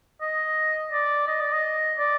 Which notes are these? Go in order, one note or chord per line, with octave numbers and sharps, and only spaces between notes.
D#5
D5
D#5
D5
D#5
D5